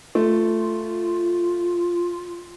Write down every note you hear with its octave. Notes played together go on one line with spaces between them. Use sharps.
A3 F4